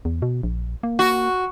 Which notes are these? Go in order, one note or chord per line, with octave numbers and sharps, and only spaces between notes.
E2
B2
A#1
A#3
F#4